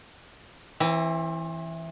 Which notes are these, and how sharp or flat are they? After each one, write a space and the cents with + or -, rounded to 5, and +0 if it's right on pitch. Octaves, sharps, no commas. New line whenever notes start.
E3 +0 C4 +35